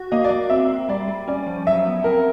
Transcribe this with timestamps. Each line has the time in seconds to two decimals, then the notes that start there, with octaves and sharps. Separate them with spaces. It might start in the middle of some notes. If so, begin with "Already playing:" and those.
Already playing: F#4
0.12 A#3 D#5
0.24 D5
0.30 A#3
0.50 C4 E5
0.70 C4
0.89 G3 D5
1.08 G3
1.28 C#4 D5
1.47 F3
1.66 F#3 E5
1.86 B3
2.04 C4 A#4